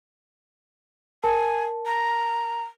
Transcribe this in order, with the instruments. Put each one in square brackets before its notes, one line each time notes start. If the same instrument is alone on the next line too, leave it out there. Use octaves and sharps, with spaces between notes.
[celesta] A#4 A5 [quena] G#5
[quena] A#5